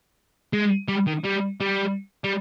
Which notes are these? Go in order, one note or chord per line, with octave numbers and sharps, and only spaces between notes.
G#3
G3
D#3
G3
G3
G3